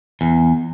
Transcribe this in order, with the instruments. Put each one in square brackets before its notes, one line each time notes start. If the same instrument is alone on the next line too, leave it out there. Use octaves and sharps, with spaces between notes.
[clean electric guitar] E2